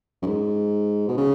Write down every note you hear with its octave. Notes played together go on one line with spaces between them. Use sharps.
F#2
G#2
B2
C#3